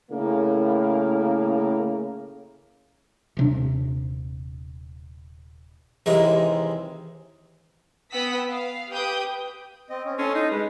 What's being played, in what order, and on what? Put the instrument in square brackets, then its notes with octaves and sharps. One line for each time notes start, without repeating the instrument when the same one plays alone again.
[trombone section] A2 C#3 A#3
[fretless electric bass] D#1 C3 D4
[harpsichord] D#2 C3 E3 G#3 A#4 A#5
[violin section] B3 F#5 G5 D#6 E6 B6
F5
G4 B4 G5 D#6 G6
[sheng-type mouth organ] C4 D#5
C#4
[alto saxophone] C#4 [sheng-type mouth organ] A4 D#5 C6
[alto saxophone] D#4
[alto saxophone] G#3 [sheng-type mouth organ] B4